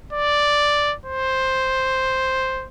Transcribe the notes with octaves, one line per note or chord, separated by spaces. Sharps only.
D5
C5